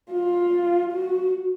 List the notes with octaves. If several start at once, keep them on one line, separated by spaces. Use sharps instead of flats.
F4
F#4